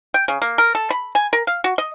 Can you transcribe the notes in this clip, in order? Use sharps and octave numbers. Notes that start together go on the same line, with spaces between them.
G5
C#3
A#3
A#4
A4
B5
G#5
A#4
F5
F#4
D#5